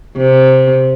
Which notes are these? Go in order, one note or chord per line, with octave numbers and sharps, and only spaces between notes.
C3